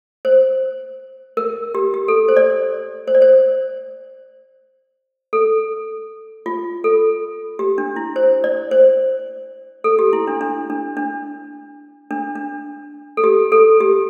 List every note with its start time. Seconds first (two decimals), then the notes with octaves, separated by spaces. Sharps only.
0.25 C5
1.37 A#4
1.75 G4
1.94 G4
2.08 A4
2.28 C5
2.37 D5
3.08 C5
3.15 D5
3.22 C5
5.33 A4
6.46 F4
6.84 A4
7.59 G4
7.78 D4
7.96 E4
8.16 C5
8.44 D5
8.71 C5
9.84 A4
9.99 G4
10.13 E4
10.27 D4
10.41 D4
10.70 D4
10.97 D4
12.11 D4
12.35 D4
13.17 A4
13.24 G4
13.52 A4
13.80 G4